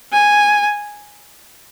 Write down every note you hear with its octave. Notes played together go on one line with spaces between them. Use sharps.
G#5